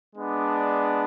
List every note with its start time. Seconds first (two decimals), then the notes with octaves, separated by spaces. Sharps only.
0.16 G#3 B3 D4